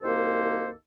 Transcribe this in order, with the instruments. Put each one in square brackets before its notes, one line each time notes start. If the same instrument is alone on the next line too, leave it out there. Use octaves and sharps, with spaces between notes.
[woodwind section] C2 F#2 D#3 A#3 A4 C5